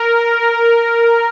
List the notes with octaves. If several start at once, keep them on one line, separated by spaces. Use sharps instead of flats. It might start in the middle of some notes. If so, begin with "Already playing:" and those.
Already playing: A#4